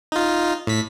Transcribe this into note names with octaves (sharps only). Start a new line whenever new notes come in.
D#4 F4
A2 B6